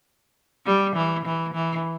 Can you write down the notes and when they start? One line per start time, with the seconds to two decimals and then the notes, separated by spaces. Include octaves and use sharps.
0.66 G3
0.96 E3
1.25 E3
1.54 E3